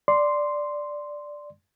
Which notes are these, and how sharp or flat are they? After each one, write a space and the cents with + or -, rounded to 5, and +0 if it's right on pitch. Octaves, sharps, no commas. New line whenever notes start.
D5 +0 C6 -5